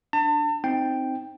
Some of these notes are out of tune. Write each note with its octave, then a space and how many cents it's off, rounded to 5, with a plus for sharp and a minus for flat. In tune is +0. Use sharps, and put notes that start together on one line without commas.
D4 +0 A5 +35
C4 +0 D#4 +0 G5 +0